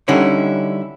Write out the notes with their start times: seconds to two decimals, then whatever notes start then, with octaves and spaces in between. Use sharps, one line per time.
0.08 D3 G3 C#4 D#4 E4